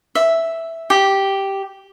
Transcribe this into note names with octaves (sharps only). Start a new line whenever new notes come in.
E5
G4